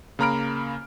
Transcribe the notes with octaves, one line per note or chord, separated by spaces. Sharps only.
C#3 A#3 A#5 B5 F6 D7